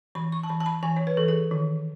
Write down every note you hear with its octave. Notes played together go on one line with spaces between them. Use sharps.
E3 B5
C#6
A5
E3 B5
A5
B5
E3 G#5
C#5
B4
E3 A4
G#4
D#3